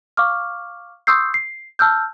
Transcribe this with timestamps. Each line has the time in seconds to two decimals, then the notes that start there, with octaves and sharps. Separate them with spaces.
0.17 F5 C#6 D6 F6
1.07 C6 C#6 D#6 E6 G6 C7
1.34 C7
1.79 A5 E6 F6 G6